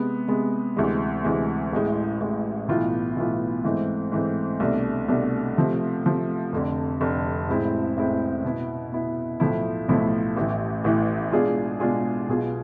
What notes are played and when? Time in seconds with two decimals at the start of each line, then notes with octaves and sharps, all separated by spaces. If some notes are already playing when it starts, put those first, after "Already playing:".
Already playing: C3 G#3 B3
0.28 C3 G#3 B3
0.77 D2 C3 E3 G#3
1.25 D2 C3 E3 G#3
1.73 A1 A2 G#3
2.20 A1 A2 G#3
2.68 B1 A2 E3 B3 F4
3.16 B1 A2 E3 B3 F4
3.64 G#2 E3 A3 C4
4.12 G#2 E3 A3 C4
4.60 C2 B2 A3 D4
5.09 C2 B2 A3 D4
5.56 C3 F3 A3
6.04 C3 F3 A3
6.52 F1 F2 D3
7.01 F1 F2 D3
7.48 A1 A2 G#3 C4 E4
7.96 A1 A2 G#3 C4 E4
8.44 B2 B3 E4
8.92 B2 B3 E4
9.40 B1 A2 F3 A3 E4
9.88 B1 A2 F3 A3 E4
10.37 A1 A2 E3
10.84 A1 A2 E3
11.32 B2 G#3 D4 F4 G#4
11.80 B2 G#3 D4 F4 G#4
12.29 B1 B2 B3 F4 G#4